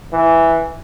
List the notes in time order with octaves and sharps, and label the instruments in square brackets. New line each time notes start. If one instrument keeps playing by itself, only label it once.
[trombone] E3